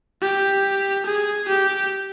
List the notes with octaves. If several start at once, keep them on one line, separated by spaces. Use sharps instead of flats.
G4
G#4
G4